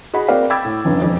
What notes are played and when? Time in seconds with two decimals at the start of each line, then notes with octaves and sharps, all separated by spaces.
0.14 F#4 G#4 D#5 B5
0.28 A#3 C4 F#4 C5 D5 F5
0.50 G5 B5 D6 E6 G#6 A6
0.65 A2
0.85 F1 C#2 G2
1.02 E1 F2